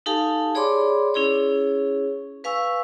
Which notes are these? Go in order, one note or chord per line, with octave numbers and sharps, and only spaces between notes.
D#4 G4 A4 F5 G#5 A5
G#4 C#5 D5 B5 C6 D6
C#4 E4 G#4 C#5
B4 F5 G#5 C#6 E6